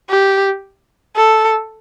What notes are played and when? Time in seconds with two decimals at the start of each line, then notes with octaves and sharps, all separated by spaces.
0.09 G4
1.16 A4